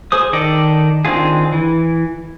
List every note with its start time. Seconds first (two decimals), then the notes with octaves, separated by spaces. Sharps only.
0.12 G#4 C5 D#6
0.33 D#3 A4 D5 D#5
1.05 D#3 C4 D4 F4 G#4
1.52 E3